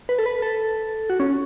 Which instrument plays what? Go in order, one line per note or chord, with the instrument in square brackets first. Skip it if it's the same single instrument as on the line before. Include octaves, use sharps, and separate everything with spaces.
[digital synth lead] B4
A4
B4
A4
F#4
C#4